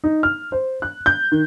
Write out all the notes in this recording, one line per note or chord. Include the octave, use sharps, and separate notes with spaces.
D#4
F6
C5
F#6
G6
D#3